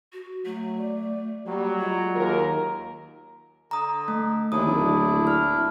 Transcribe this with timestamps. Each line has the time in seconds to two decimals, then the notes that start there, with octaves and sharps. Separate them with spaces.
0.13 F#4
0.45 F#3 A3
0.79 D5
1.47 F#3 G3 A#3
1.79 G#3 F4
2.16 D#2 A#4
3.71 D3 A#5 D#6
4.08 A3
4.52 D#2 A#2 D4 E4 D#6
4.67 D1
5.27 F6